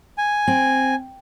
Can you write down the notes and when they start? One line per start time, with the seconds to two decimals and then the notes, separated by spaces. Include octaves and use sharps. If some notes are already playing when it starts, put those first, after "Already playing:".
0.18 G#5
0.47 C4